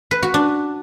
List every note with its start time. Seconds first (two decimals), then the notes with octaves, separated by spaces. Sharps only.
0.11 B4
0.23 F#4
0.34 D4